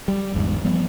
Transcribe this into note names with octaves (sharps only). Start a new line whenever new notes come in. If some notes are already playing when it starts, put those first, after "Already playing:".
G3
G1 E2 G#2
F3 G3 B3